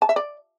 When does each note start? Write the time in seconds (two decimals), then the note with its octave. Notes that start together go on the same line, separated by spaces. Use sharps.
0.02 A5
0.09 E5
0.16 D5